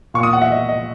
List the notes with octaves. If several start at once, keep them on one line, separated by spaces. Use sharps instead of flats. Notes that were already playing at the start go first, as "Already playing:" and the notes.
A#2 C#6
D#6
F#5
E5
D#5
D#5